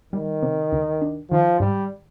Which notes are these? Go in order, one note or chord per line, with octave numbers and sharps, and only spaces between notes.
D#3 G3
C3
D2
D4
D#3 F3
G#2 G3